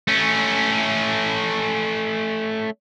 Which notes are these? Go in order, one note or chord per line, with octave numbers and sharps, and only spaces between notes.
A3 C#4